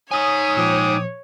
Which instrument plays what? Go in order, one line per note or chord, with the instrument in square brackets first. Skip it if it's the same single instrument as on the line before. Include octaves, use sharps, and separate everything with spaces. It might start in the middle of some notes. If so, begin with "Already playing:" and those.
[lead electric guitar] D#4 G#5 [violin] C#5 [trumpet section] D#6
[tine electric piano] A#2 F3 [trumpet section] G5 D6 D#6